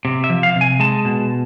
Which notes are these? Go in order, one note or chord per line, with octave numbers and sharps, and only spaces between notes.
C3
E5
F3
F5
C3
G#5
G#3 A5
B2